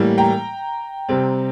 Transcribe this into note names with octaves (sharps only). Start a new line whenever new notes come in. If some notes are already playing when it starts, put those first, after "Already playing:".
Already playing: A2 E3 G3 A#3
G5 A#5
C3 G3 C4